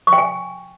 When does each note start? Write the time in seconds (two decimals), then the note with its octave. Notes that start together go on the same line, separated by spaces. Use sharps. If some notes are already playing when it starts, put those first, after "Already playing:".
0.07 C#6
0.13 G5
0.18 G#5